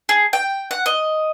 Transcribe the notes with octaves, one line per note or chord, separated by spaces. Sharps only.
G#4
G5
F#5
D#5